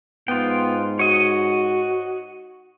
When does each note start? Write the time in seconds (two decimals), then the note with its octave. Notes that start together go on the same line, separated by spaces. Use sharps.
0.28 G#2 B3 F4 G5
0.99 F#4 C#5 D#5